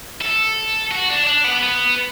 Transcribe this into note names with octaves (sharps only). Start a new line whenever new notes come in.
A4
F#4
D4
D4
B3
B3